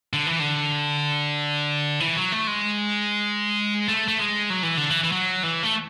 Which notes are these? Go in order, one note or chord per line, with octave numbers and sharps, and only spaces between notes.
D3
E3
D3
E3
F#3
A3
G#3
A3
A3
G#3
F#3
E3
D3
E3
E3
F#3
E3
A3